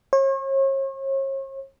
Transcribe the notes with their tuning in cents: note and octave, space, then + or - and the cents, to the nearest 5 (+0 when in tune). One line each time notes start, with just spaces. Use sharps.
C#5 -40